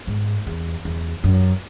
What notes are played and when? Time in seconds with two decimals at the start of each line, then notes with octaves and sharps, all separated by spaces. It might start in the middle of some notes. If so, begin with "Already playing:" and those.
0.07 G#2
0.47 E2
0.85 E2
1.24 F#2